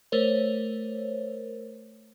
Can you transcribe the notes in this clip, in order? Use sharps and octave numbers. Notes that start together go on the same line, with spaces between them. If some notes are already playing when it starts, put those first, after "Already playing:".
A3 A#4 C5 C#5